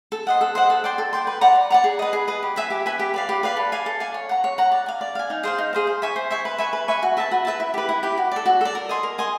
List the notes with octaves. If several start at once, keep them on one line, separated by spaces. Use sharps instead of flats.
A4
C5 D#5 F#5
A4
C5 D#5 F#5
A4
D5 G5 C6
A4
D5 G5 C6
B4
D5 F#5 A#5
B4
D5 F#5 A#5
G#4
B4 D#5
G#4
B4 D#5
G4
B4 E5 G#5
G4
B4 E5 G#5
G4
B4 D5 F5
G4
B4 D5 F5
A4
D5 F5 G#5
A4
D5 F5 G#5
C#5
F#5 A#5
C#5
F#5 A#5
D5
F5 G#5
D5
F5 G#5
D#4
G#4 C5 F5
D#4
G#4 C5 F5
C5
E5 G#5 C#6
C5
E5 G#5 C#6
B4
E5 G#5 C#6
B4
E5 G#5 C#6
F#4
B4 E5 A5
F#4
B4 E5 A5
E4
G4 B4
E4
G4 B4
F#4
A4 D5
F#4
A4 D5
A#4
D#5 G#5 C6
A#4
D#5 G#5 C6